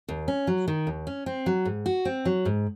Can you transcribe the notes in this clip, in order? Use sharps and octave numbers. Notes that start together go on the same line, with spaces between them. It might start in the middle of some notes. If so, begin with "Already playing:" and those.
D#2
C#4
F#3
D#3
D#2
C#4
C4
F#3
G#2
F#4
C4
F#3
G#2